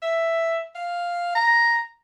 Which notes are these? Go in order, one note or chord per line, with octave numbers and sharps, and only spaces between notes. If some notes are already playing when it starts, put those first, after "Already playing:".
E5
F5
A#5